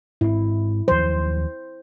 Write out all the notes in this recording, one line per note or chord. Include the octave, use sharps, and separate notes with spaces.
G#2 C4 E4
D#2 F3 F#3 C5